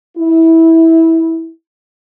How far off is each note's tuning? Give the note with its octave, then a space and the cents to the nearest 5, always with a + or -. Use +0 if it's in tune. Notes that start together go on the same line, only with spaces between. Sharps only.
E4 -15